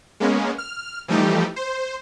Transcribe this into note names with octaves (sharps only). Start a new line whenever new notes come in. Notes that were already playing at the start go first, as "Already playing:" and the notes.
G#3 A#3 B3 C#4
F6
E3 F3 G3 A3 D#4 G4
C5